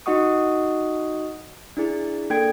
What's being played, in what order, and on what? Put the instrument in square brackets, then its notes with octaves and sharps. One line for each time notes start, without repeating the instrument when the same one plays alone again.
[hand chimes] D#4 F#4 D#5 F#5 C#6 D#6
D4 E4 G#4
A#3 D4 A4 G5 G#6 D7